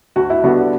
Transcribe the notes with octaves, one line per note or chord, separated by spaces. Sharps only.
D2 F#4
E4
D3 G3 B3 F#4